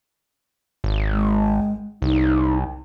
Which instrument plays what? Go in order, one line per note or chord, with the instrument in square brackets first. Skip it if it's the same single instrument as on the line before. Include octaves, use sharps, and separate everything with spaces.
[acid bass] G#1
[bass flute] G#3
[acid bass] C2 [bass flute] D#4